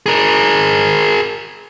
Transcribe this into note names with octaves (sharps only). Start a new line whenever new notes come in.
G#4 A#4